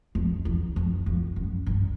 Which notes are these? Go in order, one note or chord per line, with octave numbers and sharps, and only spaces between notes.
F2
E2
F2
F2
F#2
G2